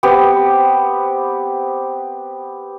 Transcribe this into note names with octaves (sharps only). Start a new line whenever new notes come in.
B3 C4 G4 B4